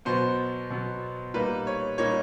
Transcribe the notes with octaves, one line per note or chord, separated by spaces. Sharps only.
B2 F#3 B3 C5
B2 F#3 B3
A#2 G3 A#3 D#4 B4
C#5
A#2 G3 A#3 D#4 C#5